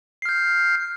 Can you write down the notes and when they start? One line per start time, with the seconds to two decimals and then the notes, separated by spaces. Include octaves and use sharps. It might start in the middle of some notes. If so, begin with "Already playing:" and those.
0.22 C7
0.25 F6
0.29 G6